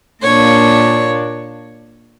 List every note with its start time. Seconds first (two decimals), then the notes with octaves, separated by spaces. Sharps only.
0.23 A#2 A#3 D4 C#5